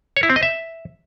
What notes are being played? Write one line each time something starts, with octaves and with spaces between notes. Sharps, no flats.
C#5
E4
C4
D#5
E5